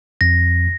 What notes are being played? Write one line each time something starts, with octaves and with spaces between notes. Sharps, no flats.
F2 A#6